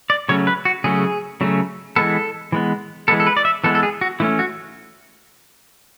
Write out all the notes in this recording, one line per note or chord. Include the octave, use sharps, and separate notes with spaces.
D5
C#3 F#3 A3 C#4 C#5
B4
F#4
C#3 F#3 A3 C#4 G#4
C#3 F#3 A3 C#4
E3 G#3 B3 A4
E3 G#3 B3
E3 G#3 B3 A4
A4
B4
D5
E5
E3 G#3 B3 A4
A4
G#4
F#4
E3 A3 C#4 E4
F#4